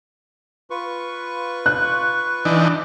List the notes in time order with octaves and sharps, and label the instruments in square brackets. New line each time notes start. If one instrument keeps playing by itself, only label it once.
[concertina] F4 B4 C#6
[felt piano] F#6
[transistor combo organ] E3 D4 D#4